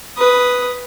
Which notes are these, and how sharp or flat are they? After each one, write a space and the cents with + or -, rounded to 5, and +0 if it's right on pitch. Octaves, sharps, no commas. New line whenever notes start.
B4 +0 D#6 +0